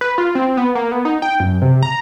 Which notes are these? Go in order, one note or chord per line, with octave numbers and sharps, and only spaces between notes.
B4
F4
C4
B3
A#3
B3
D#4
G5
F#2
C3
A#5